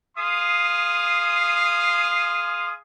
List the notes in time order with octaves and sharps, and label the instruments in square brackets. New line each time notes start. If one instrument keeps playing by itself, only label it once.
[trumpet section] G#4 F5 C6 D#6